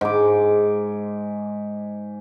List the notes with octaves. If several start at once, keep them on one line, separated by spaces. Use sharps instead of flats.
G#2 D6